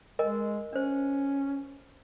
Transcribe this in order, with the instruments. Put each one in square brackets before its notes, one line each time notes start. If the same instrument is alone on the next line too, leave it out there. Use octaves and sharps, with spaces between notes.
[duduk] G#3 [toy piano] A#4 D#5 G#5
[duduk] C#4 [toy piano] D4 C5